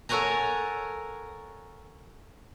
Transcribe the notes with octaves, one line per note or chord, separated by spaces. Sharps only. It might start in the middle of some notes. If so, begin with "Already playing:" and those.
A4 A#4 C#5 F#5 G#5 A#5